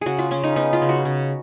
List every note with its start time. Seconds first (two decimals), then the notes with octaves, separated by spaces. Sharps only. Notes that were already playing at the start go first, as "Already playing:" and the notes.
0.01 C#3 F#4 G#4
0.19 F4
0.31 C#3 C#4
0.43 D#4
0.56 B3 D#4
0.73 F4
0.81 C#3
0.89 F#4
1.05 C#3